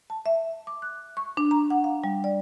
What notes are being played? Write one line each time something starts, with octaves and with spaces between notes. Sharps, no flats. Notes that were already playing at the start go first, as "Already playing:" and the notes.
A5
E5
D6
F#6
C#6
D4
A#5
F#5
F5
G3
D5